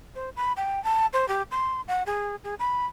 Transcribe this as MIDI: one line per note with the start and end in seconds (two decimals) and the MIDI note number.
0.15 0.30 72
0.36 0.53 83
0.57 0.82 79
0.84 1.06 81
1.13 1.28 72
1.28 1.42 67
1.51 1.81 84
1.88 2.03 78
2.06 2.36 68
2.44 2.55 68
2.59 2.86 83